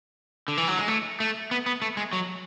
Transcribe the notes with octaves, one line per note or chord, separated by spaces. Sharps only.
D3
E3
F#3
G#3
A3
A3
B3
B3
A3
G#3
F#3